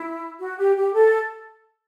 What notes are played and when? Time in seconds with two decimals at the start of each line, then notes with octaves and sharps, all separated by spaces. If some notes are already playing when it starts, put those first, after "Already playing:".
Already playing: E4
0.39 F#4
0.58 G4
0.76 G4
0.93 A4